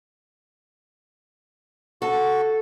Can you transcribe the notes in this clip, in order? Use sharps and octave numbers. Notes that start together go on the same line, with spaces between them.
F#4 A4